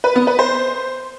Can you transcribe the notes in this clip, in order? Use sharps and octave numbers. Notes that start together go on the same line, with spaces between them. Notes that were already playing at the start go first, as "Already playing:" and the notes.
B4
B3
B4
C5